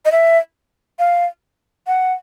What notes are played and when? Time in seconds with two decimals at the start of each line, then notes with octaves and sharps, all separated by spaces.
0.05 D#5
0.12 E5
0.99 F5
1.87 F#5